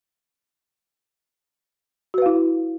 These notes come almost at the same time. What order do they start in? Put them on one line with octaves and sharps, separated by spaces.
F#4 B4 F5 E4